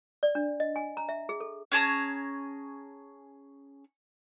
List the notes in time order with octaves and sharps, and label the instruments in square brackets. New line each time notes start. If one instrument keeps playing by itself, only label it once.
[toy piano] D5
D4
D#5
G#5
A#5
E5
G#4
A4
[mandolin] C#4 G#4 A5 A#5